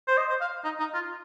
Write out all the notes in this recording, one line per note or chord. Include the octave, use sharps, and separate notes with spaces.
C5
D#5
C5
F5
D#4
D#4
F4